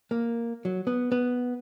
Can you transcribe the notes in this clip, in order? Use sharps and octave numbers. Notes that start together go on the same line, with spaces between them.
A#3
F#3
B3
B3